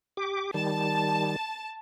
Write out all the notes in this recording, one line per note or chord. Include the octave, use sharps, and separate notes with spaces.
G4 D6
D#3 G3 A5